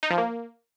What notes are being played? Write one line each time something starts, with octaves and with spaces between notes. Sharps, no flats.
D#4
F3
A#3